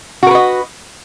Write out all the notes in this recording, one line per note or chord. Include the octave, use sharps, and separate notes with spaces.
F#4 A#4 B4 D#5